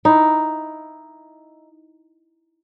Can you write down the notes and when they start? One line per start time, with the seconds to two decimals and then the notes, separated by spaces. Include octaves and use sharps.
0.05 D#4 E4